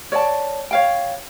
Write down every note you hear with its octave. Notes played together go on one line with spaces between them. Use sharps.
C#5 D5 G5 A5
C#5 F5 G5